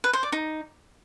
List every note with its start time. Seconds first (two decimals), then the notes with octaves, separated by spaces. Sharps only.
0.04 B4
0.13 C5
0.23 D5
0.32 D#4